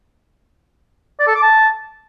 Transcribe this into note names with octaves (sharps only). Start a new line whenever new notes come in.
D5
A4
D6
A5